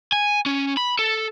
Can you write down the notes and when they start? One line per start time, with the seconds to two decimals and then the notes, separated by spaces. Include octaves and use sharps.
0.12 G#5
0.46 C#4
0.77 B5
0.99 A4